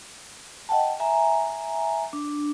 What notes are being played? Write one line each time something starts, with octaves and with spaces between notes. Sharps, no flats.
D#5 F#5 G5 A5
E5 G#5 A#5
D4